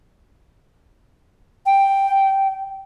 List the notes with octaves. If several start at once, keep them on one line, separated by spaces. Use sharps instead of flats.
G5